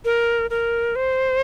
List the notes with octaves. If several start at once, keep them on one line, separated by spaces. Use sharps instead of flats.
A#4
A#4
C5